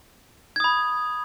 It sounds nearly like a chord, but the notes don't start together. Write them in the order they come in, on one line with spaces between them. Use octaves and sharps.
G#6 D#6 B5